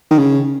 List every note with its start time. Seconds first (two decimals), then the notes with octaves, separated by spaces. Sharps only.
0.11 D#3
0.18 C#3